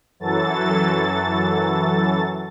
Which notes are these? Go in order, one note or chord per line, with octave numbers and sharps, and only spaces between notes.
F#2 E3 F#3 A4 A6